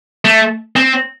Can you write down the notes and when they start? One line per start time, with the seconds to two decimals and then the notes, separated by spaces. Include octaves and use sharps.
0.25 A3
0.76 C4